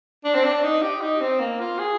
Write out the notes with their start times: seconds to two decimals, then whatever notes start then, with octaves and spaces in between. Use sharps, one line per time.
0.24 D4
0.35 C4
0.44 D4
0.63 D#4
0.82 G4
1.01 D#4
1.21 C4
1.39 A#3
1.60 F4
1.79 G#4